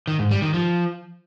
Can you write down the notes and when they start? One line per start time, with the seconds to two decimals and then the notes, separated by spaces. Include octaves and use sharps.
0.07 D#3
0.19 G#2
0.31 G3
0.42 D#3
0.54 F3